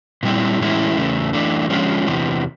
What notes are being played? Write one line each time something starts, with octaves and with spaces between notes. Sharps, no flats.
A#2 G3 C4 E4
A2 E3 G#3 C#4 E4
E2 C#3 A3
E3 A3 D4
D3 F3 G#3 C#4 F4
E2 C3 E3